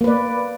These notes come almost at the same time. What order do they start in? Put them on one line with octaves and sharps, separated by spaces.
A#3 B4 D5